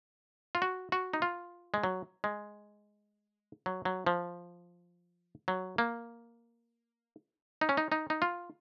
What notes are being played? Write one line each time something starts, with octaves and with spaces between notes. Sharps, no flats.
F4
F#4
F#4
D#4
F4
G#3
F#3
G#3
F#3
F#3
F3
F#3
A#3
D#4
C#4
D#4
D#4
D#4
F4